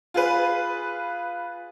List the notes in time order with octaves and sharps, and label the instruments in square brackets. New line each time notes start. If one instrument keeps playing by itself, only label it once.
[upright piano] F4 G#4 B4